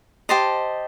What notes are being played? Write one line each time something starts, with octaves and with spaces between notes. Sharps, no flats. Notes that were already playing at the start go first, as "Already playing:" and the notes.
G4 C5 D#5 A5